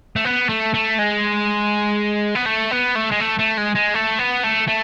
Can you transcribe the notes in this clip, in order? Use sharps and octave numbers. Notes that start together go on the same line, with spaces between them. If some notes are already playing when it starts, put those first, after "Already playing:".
A3
B3
A3
A3
G#3
B3
A3
B3
A3
G#3
A3
A3
G#3
G#3
A3
B3
A3
A3